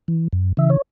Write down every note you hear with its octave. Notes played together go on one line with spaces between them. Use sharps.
E3
F#2
C#3 E3 E5
C#5